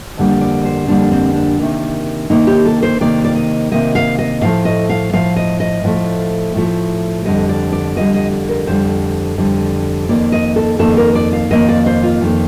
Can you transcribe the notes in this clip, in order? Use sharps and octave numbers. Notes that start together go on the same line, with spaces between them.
F2 D3 G3 A#3
D5
C5
F2 D3 G3 A#3 D4
C4
D4
C3 D#3 A#3
C3 D#3 A#3 D#4
G4
A4
C5
C3 D#3 A#3 D5
D5
D#5
C3 D#3 A#3 D#5
F5
D#5
A2 F3 A3 F5
D#5
F5
A2 F3 A3 F5
D#5
D#5
A2 F3 A3
A2 F3 A3
F2 D3 G3 D#5
D5
D5
F2 D3 G3 D#5
D#5
D5
A#4
F2 D3 G3 C5
F2 D3 G3
F2 D#3 A#3 D5
D#5
A4
F2 D#3 A#3 A4
A#4
D5
F5
F2 D#3 A#3 D#5
D5
C5
F4
F2 D#3 A#3